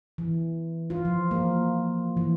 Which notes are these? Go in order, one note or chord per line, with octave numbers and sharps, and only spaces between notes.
E3
F4
F3
A#3
E3